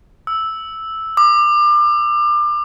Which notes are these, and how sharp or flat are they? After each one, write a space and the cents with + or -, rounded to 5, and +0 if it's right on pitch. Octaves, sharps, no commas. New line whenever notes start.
E6 -5
D6 +30